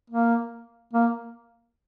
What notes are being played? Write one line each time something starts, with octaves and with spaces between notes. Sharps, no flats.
A#3
A#3